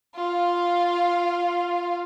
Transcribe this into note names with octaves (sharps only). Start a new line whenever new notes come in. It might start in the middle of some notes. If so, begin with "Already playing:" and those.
F4 F5